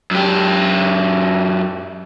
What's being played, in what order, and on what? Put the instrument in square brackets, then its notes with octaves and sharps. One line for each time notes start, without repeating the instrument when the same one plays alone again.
[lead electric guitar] F#2 G4